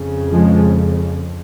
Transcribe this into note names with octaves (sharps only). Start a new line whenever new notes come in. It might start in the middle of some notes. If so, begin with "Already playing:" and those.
Already playing: F2 C#3
F3 G#3